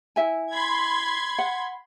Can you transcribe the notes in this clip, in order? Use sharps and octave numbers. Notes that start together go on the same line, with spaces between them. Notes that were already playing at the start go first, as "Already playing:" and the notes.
E4 E5 G#5
B5 C6 G#6
F#5